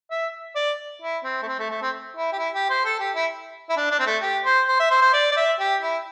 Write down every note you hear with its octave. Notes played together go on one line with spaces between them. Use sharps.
E5
D5
E4
C4
A3
C4
A3
A3
C4
E4
G4
E4
G4
C5
A4
G4
E4
E4
D4
D4
C4
A3
G4
C5
C5
E5
C5
C5
D5
D5
E5
G4
E4